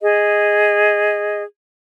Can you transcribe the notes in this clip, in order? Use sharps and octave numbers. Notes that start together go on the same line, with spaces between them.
G#4 D#5